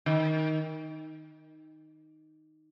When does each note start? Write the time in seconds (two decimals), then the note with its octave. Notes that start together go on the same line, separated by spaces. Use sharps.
0.06 D#3